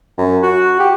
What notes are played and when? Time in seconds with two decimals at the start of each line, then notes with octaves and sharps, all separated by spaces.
0.18 F#2
0.43 F#4
0.79 G4